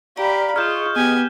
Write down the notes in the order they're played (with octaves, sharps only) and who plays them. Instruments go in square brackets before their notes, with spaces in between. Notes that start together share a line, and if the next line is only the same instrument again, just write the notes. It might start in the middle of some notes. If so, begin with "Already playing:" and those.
[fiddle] G4 B5 [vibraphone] D5 A#5 [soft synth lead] F5
[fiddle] F4 [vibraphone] G#4 D#5 D#6 [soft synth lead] C#6 [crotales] F6 G6 E7
[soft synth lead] B3 [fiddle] G4 G#5